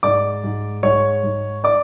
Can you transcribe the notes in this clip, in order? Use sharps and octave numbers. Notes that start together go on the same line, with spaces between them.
G#2 D5 D6
G#2
G#2 C#5 C#6
G#2
D5 D6